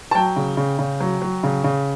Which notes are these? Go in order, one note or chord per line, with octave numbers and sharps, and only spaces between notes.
A5
F#3 G5
C#3
C#3
C#3
F#3
F#3
C#3
C#3